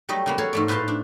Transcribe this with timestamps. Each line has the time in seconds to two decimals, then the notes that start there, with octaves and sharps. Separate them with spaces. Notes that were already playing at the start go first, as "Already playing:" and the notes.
0.09 F#3 G3 A3 D#5
0.26 C#3 A#3 B3
0.38 F#4 A4 C#5 F5
0.53 G#2 A3 D5
0.68 A2 B4 C5 F5 A5 C6
0.88 D4